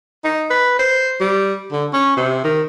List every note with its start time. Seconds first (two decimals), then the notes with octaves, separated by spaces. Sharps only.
0.24 D#4
0.50 B4
0.79 C5
1.20 G3
1.72 D3
1.93 C#4
2.17 C3
2.44 D#3